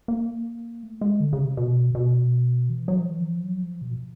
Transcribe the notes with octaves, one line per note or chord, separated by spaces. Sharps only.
A#3
A3
G#3
D3
C#3
C3
B2
B2
E3
F#3
F3
E3
F3
F#3
F3
B2
A#2